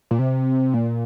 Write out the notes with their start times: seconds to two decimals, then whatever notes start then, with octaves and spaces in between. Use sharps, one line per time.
0.11 A#2
0.19 C3
0.74 A#2